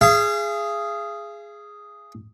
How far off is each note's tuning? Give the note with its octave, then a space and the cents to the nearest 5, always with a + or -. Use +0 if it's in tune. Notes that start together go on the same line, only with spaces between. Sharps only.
G#4 +0 F5 -40